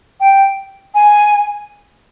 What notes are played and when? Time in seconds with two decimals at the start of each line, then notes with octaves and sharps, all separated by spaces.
0.20 G5
0.95 G#5